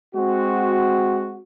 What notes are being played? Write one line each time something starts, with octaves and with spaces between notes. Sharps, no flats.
G#3 C4 F#4